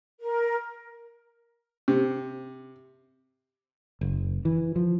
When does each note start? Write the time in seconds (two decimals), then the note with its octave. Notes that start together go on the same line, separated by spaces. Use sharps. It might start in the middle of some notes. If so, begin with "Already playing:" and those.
0.20 A#4
1.88 C3
4.01 F#1
4.45 E3
4.76 F3